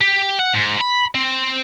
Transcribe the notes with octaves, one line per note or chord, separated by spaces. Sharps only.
G4
F#5
G#2
B5
C4